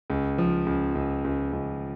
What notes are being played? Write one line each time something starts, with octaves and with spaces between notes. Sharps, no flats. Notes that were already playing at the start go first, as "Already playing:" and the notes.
C#2
F3
C#2
C#2
C#2
C#2